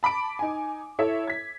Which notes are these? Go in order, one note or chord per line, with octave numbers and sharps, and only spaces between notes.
A5 B5 D6 D7
D#4 G#5
E4 A4 C#5 E5
G#6 B6